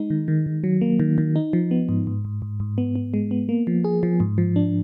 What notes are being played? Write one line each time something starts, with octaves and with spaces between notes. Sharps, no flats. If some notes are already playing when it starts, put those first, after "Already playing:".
Already playing: G#3 D#4
D#3
D#3
D#3
F#3
A#3
D#3
D#3
D#4
F3
B3
G#2
G#2
G#2
G#2
G#2
B3
B3
G#3
B3
A#3
F3
G#4
F3
G#2
F3
D4